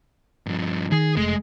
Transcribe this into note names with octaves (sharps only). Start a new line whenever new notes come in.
G2 F3
D#3 G#4
F1 G#3 A3